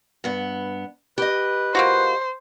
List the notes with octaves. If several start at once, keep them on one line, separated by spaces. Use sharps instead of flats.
G2 B3
G4 B4 D#5
A#3 F4 F#4 C5